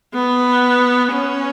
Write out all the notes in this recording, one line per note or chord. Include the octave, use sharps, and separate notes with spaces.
B3
C#4